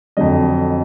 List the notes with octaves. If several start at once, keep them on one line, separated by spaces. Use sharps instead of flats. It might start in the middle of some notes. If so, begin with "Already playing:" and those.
F2 D3 F#3 D#5